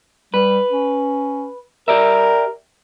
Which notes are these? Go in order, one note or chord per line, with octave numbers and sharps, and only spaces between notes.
G3 B4
C#4
G4 A#4 D5 E5